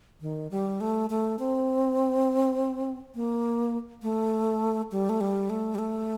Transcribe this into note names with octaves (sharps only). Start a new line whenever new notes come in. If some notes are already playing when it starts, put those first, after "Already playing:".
D#3
G3
A3
A3
C4
A#3
A3
G3
A3
G3
A3
G3
A3